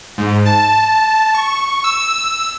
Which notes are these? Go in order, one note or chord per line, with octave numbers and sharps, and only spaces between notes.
G#2
A5
C#6
E6